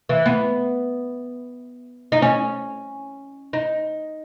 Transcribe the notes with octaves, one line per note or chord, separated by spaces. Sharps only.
E3
B3
D#4
C#4
D#4